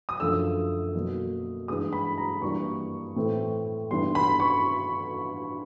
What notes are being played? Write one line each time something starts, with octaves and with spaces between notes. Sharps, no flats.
D#6
F#2 D3 F3 A3 E6
B2 F#3 A#3
G2 E3 G#3 D#6
B5
A#5
G2 E3 G3 A#3 D4 C#6
A2 E3 A3 C4
G2 E3 G3 B3 C6
B5
C#6